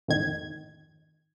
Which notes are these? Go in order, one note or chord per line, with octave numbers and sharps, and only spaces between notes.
G#1 F2 A2 D#3 G#6